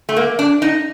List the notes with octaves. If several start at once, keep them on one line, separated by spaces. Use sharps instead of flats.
A3
A#3
D4
D#4